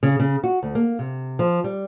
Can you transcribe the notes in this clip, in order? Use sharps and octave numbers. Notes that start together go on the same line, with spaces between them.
C#3
C#3
F#4
D2
A#3
C3
F3
G3